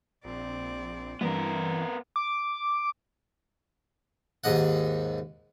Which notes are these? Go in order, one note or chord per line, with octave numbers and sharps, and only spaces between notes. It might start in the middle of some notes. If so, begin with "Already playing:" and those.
A#1 C4 D5
G2 E3 B3 C4 A#4
D6
D#2 G#2 D#5 F#5